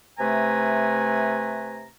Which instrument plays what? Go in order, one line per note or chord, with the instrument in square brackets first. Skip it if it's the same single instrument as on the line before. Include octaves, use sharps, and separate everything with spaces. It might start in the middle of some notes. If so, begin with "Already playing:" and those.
[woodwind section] C3 A3 B4 G#5 A#5